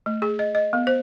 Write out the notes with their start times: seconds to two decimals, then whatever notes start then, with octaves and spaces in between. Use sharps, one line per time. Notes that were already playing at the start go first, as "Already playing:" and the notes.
0.06 A3
0.22 G#4
0.39 D#5
0.55 D#5
0.73 B3
0.87 C5